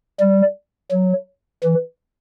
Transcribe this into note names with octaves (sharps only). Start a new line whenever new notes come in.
G3
F#3
E3